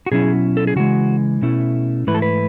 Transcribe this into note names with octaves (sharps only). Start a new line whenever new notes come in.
F#4
B2 F#3 C#4 E4 G#4
A4
G#4
C#3 E3 G#3 F#4
B2 A3 C#4 E4
G#2 E3 A3 E4 B4
A4
B4